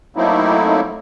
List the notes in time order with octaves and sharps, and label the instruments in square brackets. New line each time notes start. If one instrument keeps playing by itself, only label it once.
[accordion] F#3 A3 A#3 C4 D#4 E4